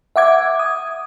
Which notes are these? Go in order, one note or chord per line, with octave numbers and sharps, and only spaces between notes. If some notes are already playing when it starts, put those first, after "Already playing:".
E5 F#5 D6 G#6
D#6